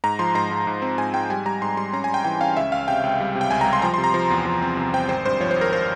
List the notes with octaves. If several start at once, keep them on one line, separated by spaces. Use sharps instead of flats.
G#2 A#5
F3 C6
G#2 A#5
G#2
G#2
C4
G#2 G#5
G#2 G5
G3 G#5
G3 A#5
G#2 C6
G3 C6
C#4 A#5
G#5
G3 G5
E3 G5
C#4 F5
C#2 E5
C#2 F5
C3 G5
C#2
G3
C3
G5
C#2 G#5
A#5
G3
C6
F3 A#5
C6
C3
A#5
F3
E2
F3
C4
C3
C4 G5
G#1 C5
G2 C5
F3 C#5
C5
G#1
A#4
C5